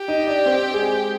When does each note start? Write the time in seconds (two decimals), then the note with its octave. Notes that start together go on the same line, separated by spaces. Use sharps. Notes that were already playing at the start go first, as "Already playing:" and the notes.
Already playing: G4
0.08 D#4 D#5
0.27 D4 D5
0.46 C4 C5
0.74 G#3 G#4